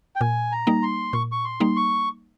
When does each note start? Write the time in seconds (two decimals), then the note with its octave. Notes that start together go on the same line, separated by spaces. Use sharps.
0.16 G5
0.21 A#2 G#5
0.52 A#5
0.67 G3 A#3 D#4
0.83 C6
1.13 A#2 C#6
1.32 C#6
1.45 C6
1.60 G3 A#3 D#4
1.76 C#6